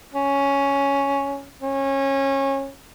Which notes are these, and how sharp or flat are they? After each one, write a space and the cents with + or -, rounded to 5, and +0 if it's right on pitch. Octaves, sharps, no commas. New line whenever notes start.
C#4 +5
C#4 -25